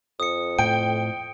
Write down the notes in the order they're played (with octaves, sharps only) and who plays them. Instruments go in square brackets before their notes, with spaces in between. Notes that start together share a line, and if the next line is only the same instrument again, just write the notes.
[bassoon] F2 [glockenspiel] D#6 C#7
[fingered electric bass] A2 [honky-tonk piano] G5 [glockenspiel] D7